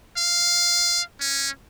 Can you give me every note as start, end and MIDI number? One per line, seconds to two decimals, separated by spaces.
0.17 1.01 77
1.20 1.49 61